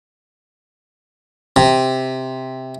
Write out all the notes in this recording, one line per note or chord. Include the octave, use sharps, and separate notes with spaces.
C3